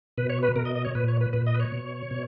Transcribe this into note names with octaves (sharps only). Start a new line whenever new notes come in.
B2 B4
C#5
B4
B2 A#4
D#5
D#5
C#5
A#2 B4
C#5
B4
A#2 B4
D#5
B4
C#5
B2
B2